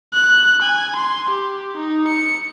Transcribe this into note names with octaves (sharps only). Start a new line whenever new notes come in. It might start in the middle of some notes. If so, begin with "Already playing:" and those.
F#6
G#5
C6
G4
D#4
C#7